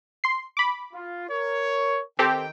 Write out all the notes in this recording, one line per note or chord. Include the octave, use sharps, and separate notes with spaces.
C6 C7
B5 D6
F4
A#4 C#5
D#3 C4 G4 A4 G5